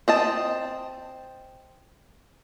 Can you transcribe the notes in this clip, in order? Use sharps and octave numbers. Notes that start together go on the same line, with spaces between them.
C4 D#5 A5